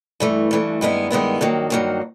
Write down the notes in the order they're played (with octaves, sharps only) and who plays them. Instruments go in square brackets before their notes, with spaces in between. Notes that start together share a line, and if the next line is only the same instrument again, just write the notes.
[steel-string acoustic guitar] G2 E3 A3
G2 E3 A3
G2 D#3 G#3 B3 E4
G2 D#3 G#3 B3 E4
G2 D#3 F#3 A#3
G2 D#3 F#3 A#3